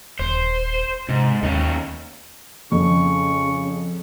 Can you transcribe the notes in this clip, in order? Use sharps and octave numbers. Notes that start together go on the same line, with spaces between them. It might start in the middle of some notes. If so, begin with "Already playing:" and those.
D#1 C5
G#2 C3
D#2 D#3 A#3 C#4
F2 C#3 C#6